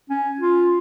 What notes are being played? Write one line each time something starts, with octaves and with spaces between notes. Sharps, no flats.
C#4
F4